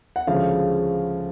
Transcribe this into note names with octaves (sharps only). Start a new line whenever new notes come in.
F#5
D2 C#3 F3 G#3 F5